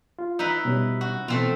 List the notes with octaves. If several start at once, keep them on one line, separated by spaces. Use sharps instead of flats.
F4
D#4 E4 B4
B2 G3 C#4
F#4
B2 E3 A3 C4 F4